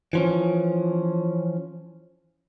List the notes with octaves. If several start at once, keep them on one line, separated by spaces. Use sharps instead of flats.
E3 F3 C#4